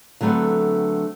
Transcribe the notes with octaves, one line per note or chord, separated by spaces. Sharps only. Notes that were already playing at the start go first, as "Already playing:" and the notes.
D3 F#3 A3 B3 C4